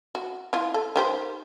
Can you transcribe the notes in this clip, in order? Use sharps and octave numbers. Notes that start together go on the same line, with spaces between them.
F#4
E4 F4
A4
D#3 G4 C5